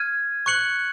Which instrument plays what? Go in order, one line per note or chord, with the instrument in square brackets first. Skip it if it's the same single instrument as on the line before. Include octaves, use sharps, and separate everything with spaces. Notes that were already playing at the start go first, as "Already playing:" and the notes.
Already playing: [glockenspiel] F6 G#6 D#7
C#6 F#6 C#7 F#7